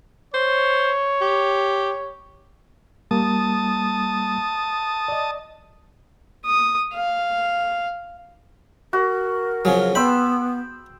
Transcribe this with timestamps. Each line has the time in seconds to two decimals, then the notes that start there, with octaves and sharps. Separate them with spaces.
0.34 C5 C#5
1.21 G4
3.11 G3 A#3 A5 D#6
5.08 D5 D#5
6.46 D#6
6.94 F5
8.93 F#4 A#4
9.65 C#3 F3 F#3 G#4
9.95 B3 G5 B5 C6 E6